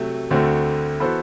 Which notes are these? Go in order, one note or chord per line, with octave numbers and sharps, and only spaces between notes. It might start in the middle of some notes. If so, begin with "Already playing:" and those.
Already playing: C3 F#3 A3
D2 D3 A3 C4 F#4
E3 B3 F#4 A4 C5